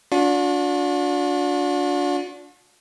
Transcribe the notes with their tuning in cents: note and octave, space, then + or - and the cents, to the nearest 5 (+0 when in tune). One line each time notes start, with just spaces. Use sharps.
D4 -20 F#4 -45